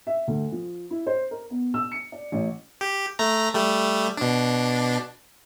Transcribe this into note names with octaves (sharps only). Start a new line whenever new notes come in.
E5
D2
F3
E4
C5
A#4
B3
E6
C#7
D5
A1
G4
A3 A#5
G3 A3
B2 D4